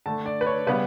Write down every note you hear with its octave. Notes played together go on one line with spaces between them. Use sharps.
D3 A3 A5
D5
B4
C#5
C#3 G3 B3 B4